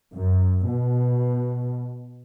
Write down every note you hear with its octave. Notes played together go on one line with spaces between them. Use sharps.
F#2
B2